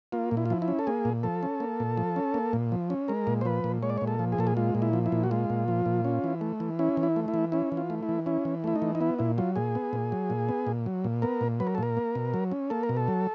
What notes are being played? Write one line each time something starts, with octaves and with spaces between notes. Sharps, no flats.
A#3 F4
A#2
E4
F4
F3 E4
E4
C#4
A4
A#3 G#4
A#2
F3 A4
C#4
A#3
A#2
F3
C#4
A#3
A#2
F3
C#4
G#3 A#4
A#2
C5
F3 B4
A#2
G#3 C#5
D5
C#5
A#2
A4
F3
G#4
A#2 A4
G#4
G#3 F4
A#2
E4
F3
E4
A#2
F#4
G#3 F4
A#2
F3
A#2
C#4
E3
A3
E3
C#4 E4
E3
E4
A3
E4
E3
C#4 E4
E3
F4
A3
E4
E3
C#4 E4
E3
A3 E4
D#4
E3
D#4
B3 E4
A#2 E4
F#3 F4
A#2 G#4
B3
A#2
F#3
A#2
B3
A#2
F#3
A#2
B3 A#4
A#2
F#3 B4
A#4
A4
A#2 A#4
A#3
B2
F#3
C#4
A#3 A4
A#4
B2
A4
F#3